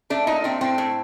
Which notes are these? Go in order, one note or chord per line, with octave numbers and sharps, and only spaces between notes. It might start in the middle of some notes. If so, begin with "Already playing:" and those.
A3 D4
A#2 D#4
A3 C4
A2 C4
A2